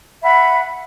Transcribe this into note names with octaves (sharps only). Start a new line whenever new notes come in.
E5 F#5 B5